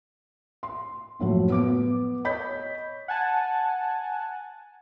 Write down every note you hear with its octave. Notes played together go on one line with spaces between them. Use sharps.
C6
F#1 A2 F3 F#3
B3 D6 D7
C#5 D#5 B5 G6 B6
F#5 G#5 A5